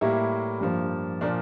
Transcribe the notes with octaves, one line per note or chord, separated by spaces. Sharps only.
A2 G3 A#3 E4
G2 F3 A#3
A#2 F3 A#3 D4